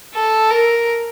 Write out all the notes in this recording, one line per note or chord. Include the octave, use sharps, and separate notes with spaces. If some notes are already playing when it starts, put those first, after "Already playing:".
A4
A#4